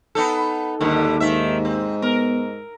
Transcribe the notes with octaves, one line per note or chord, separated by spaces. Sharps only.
B3 D#4 A4
D#2 G#2 D3 D#3 G3
G#2 D#3 E5
C4
B3 A#4